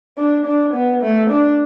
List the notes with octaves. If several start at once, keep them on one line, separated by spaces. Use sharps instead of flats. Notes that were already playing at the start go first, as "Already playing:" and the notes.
D4
D4
B3
A3
D4